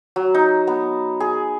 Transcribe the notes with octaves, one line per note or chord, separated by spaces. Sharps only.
F#3
D#4
B3
G#4